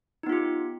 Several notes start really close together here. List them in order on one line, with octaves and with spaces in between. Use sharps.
D#4 B3 F4 G4